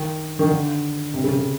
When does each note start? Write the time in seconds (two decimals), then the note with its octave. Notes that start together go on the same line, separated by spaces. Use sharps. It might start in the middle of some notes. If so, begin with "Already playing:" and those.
Already playing: D#3
0.39 D#3
0.49 D3
1.14 C3
1.24 C#3
1.35 C#3